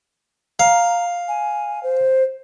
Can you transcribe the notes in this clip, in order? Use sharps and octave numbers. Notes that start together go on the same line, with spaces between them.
F5 A#5
G#5
C5